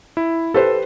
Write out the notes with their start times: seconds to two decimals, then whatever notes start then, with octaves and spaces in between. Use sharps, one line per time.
0.17 E4
0.54 G4 A4 B4 C5